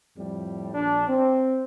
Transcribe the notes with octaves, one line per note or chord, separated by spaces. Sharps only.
F2 A2 G3
A#1 D4
C4